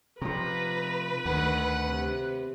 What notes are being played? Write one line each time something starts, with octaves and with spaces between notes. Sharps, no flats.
C3 F3 B4 A#5
D2 D#3 F#5
C3